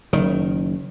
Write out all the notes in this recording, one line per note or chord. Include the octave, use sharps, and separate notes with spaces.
F#1 D#3